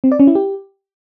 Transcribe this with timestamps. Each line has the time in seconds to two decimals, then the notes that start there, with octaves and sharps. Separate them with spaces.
0.04 C4
0.12 D5
0.19 C#4
0.27 E4
0.35 G4